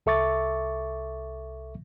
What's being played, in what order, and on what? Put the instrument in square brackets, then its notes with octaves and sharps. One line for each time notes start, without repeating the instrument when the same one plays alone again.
[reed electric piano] C2 A4 E5 C#6 D6 A6